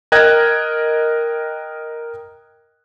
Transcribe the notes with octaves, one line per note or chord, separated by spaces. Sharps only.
A#4 D#5 G5 F#6 G#6